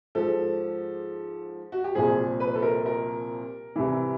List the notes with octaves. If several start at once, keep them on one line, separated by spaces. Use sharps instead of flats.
G#2 F3 A4
F#4
G4
C2 A#2 F3 G#4
B4
A4
A#4
A#4
C2 C3 E3